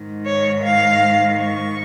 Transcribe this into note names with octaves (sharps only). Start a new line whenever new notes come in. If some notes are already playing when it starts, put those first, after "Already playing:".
Already playing: G#2 D#3
C#5
F5
C#6